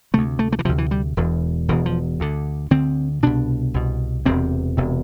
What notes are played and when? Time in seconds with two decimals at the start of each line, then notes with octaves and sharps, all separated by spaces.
0.14 D2 C3 A3
0.39 A3
0.53 A3
0.59 E3
0.65 D2 C3 F3
0.78 E3
0.91 G3
1.17 E1 E2 B2
1.68 E1 E2 B2 E3
1.86 F3
2.20 D2 D3
2.71 D2 D3 C4
3.23 C2 B2 D4
3.74 C2 B2
4.25 E1 E2 C3 C4
4.77 E1 E2 C3